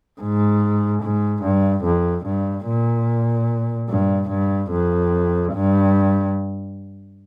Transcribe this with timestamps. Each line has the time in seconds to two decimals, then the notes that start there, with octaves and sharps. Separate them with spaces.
0.21 G#2
1.02 G#2
1.43 G2
1.84 F2
2.26 G2
2.67 A#2
3.90 G2
4.30 G2
4.71 F2
5.54 G2